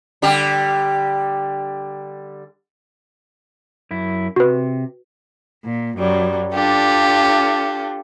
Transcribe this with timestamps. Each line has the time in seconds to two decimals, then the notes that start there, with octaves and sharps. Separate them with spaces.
0.22 D3 G3 G4
3.91 F#2 E4
4.36 C3 F#4 B4
5.65 A#2
5.98 F#2 F#3 G3
6.54 D4 F4 G4 A4